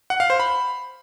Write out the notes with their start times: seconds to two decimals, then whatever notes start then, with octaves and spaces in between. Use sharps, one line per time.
0.10 F#5
0.20 F5
0.30 C5
0.40 B5